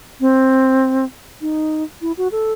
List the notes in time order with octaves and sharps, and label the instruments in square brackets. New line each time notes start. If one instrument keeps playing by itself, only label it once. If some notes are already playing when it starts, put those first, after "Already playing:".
[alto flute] C4
D#4
E4
F#4
A4